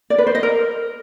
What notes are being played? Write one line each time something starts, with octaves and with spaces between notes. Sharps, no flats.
D5
B4
C5
D#5
A#4